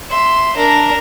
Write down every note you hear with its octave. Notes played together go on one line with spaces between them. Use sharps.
E5 C6
D4 A#4